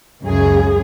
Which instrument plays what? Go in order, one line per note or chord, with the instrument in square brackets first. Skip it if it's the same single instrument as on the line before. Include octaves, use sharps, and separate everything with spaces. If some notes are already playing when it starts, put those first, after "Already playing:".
[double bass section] C#2 C#3 [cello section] F#2 G#4